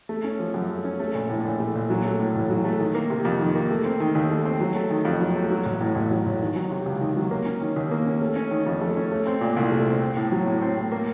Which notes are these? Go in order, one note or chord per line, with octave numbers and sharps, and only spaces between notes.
A3
C#4
F3
F#2
A3
C#4
A3
A#1
A2
A#1
A3
A#1
F#3
A3
A2
A1
F#3
A3
D#3
A#3
C3
F2
D#3
A#3
A3
C4
D#3
D#2
A3
C4
F#3
A3
D#3
F2
F#3
A3
F#3
A1
A2
A1
F#3
A1
D#3
F#3
C3
C#2
D#3
F#3
A#3
C#4
D#3
D#2
A#3
C#4
A3
C#4
D#3
F2
A3
C#4
A3
C4
A#2
C2
A3
C4
C4
A2
F#3
A2
C4
A2
A#3